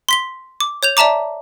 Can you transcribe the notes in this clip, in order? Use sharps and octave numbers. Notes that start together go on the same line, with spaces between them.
C6 B6 G7
D6
C#5 G6 F7
D5 E5 A5 A#5 D6